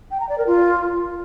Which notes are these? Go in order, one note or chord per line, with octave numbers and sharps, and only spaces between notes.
G5
A#5
D5
A#4
F4